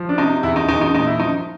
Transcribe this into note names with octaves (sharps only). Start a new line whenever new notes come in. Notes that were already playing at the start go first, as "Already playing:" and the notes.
Already playing: F3
D4
C3 D#4
E2 E4
D#4
E2 D#4
D#4
A#2 D#4
E4
F3 D#4